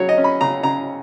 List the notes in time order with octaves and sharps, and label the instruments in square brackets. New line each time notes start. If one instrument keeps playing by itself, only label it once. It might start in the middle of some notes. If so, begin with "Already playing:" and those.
Already playing: [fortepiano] C#3 F#3 C#5
D#5
C#4
B5
C#3 A#5
C#3 A#5